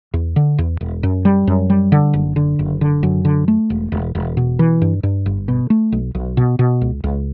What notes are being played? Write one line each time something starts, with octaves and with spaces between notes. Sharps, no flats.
E2
D3
E2
E1
F#2
G3
F#2
G3
D3
F#1
D3
F#1
D3
F#2
D3
A3
E1
E1
E1
B2
E3
G2
G2
G1
B2
A3
B1
B1
B2
B2
C#2
C#2